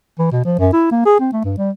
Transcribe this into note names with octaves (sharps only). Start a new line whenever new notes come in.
E3
B2
F3
F#2
E4
A#3
G#4
C4
A3
G2
G3